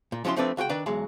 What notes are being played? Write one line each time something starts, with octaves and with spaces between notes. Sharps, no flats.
A#2
F3 F#3 C#4 E4 C6
F3 A3 C4 D4 B4 D5
C#2 F#4 A#4 G5
D#3 D4 B4 D5
B1 E2 F#3 G#3